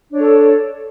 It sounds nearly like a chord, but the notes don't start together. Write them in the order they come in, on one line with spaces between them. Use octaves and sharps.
D4 C#5 A4